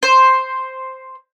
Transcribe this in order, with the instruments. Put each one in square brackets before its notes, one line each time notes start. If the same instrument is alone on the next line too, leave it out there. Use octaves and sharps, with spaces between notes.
[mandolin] C5